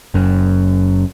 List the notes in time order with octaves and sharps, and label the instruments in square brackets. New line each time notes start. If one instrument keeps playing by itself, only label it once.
[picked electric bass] F#1 F#2